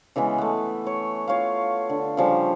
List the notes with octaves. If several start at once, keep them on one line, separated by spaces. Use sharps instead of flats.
C#3 E3 G#3 B3
A3 B3
C#5
F4 C#5 F5
D3
C#3 F3 G3